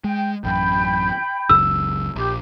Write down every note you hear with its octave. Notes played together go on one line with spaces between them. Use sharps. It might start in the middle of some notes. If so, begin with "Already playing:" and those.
G#3 G5
A1 F#2 G5 B5 G6
F#1 C#2 F#2 E6
A#1 G4 D6